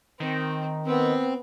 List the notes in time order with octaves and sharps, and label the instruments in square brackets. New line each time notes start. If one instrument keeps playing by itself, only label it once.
[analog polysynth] D#3 [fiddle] C4
[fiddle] B3 [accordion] C4